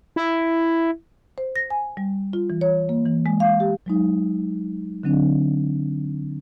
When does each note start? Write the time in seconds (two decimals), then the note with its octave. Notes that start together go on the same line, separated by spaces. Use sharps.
0.16 E4
1.38 C5
1.56 A#6
1.70 G#5
1.97 G3
2.33 F4
2.50 E3
2.61 C#5
2.89 A#3
3.06 E3
3.26 G#3
3.40 F5
3.60 G4
3.86 F#3 G#3 D#4
5.03 D3 F#3 C4 D4